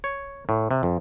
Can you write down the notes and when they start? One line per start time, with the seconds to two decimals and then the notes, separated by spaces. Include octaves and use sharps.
0.04 C#5
0.49 A2
0.71 C3
0.83 F2